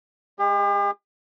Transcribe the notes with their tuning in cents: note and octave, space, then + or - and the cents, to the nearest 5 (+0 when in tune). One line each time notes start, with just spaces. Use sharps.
G#3 -5 G4 +45